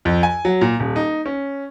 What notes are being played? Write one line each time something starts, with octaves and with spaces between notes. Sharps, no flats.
F2
G#5
F#3
A#2
D#1
D#4
C#4